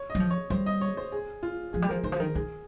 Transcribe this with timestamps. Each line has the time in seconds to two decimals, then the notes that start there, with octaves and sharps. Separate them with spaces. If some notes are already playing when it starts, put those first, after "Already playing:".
Already playing: C#5
0.10 D#5
0.15 G3
0.20 F3
0.30 C#5
0.50 G3 C5
0.66 D#5
0.81 C#5
0.97 C5
1.12 G#4
1.43 F4
1.73 F3 G#4
1.82 G3
1.89 F3 A#4
2.04 D#3 C5
2.12 F3
2.20 D#3 A#4
2.35 D#3 G#4